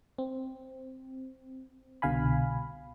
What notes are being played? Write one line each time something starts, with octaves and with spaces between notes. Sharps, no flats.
C4
C2 B2 D3 F5 G#5 B5